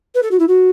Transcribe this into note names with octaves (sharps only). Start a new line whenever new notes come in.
B4
A4
F#4
E4
F#4